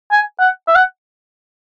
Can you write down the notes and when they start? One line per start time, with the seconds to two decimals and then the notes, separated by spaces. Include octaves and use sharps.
0.12 G#5
0.40 F#5
0.67 E5
0.75 F#5